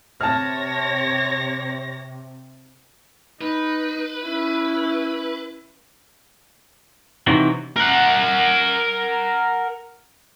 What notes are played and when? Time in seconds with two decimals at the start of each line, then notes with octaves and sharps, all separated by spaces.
0.21 C3 C#5 A5 F6 A#6
3.41 D#4 B4
4.24 C#4 E4
7.27 C3 E3 F#3 D#4
7.76 A#4 F#5